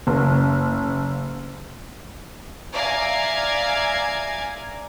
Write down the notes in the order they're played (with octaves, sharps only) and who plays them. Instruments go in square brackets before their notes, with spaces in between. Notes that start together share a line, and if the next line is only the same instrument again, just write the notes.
[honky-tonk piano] F#1
[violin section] D5 E5 F5 G#5 A#5 G#6